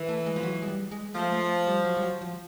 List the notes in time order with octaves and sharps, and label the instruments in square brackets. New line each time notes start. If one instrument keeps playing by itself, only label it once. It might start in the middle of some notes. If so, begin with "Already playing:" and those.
Already playing: [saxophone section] E3
[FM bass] A3
G#3
F3
F#3
G#3
G3
G#3
[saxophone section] F3 [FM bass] A3
[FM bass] A3
G3
F#3
G3
F#3
F3